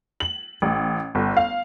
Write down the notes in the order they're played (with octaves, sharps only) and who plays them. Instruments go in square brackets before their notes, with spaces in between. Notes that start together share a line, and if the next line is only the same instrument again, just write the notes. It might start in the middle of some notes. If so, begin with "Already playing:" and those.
[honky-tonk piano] F#7
A1
G1
F5